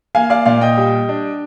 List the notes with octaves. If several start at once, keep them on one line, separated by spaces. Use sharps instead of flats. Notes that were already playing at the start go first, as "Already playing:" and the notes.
A#3 F5 G#5
D5 F5
A#2 D5 F5
D#5 G5
G3
D4